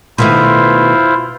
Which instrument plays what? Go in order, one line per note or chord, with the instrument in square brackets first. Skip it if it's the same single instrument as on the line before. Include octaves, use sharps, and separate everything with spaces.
[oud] B2 D#3 A3 [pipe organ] E4 F4 C5